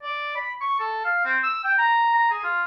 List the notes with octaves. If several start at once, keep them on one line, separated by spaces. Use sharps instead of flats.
D5
B5
C#6
A4
F5
C4
E6
G5
A#5
A#5
G#4
F4